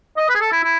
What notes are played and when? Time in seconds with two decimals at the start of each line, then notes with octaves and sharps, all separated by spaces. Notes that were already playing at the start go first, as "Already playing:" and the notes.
0.17 D#5
0.29 B4
0.35 G#4
0.41 A4
0.52 E4
0.64 E4